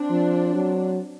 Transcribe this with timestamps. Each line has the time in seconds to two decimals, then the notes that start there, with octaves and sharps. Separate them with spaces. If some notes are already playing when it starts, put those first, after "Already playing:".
Already playing: C4 D4
0.11 F3
0.55 F#3